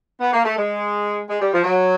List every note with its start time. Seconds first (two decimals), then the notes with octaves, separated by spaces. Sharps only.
0.20 B3
0.32 A#3
0.44 A3
0.56 G#3
1.28 G#3
1.40 G3
1.52 F3
1.64 F#3